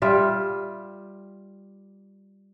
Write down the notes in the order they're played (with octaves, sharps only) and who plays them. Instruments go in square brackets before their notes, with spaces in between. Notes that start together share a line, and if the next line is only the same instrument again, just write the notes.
[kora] G3 F4 E5